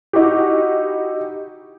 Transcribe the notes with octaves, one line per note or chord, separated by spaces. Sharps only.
D#4 E4 F#4 G4